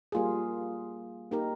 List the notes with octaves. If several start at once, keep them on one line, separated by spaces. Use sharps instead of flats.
G3 A#3 F4 G#4
A#3 D#4 G4 A#4